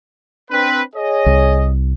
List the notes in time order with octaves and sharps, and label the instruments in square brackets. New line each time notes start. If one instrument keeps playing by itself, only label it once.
[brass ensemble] C4 D4 B4
G#4 C#5 D#5
[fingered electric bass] C2